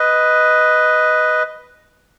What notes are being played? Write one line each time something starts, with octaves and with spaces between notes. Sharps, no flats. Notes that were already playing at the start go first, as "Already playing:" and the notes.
Already playing: B4 D#5